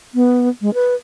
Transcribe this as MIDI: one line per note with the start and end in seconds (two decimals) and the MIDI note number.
0.15 0.49 59
0.62 0.73 56
0.74 0.95 71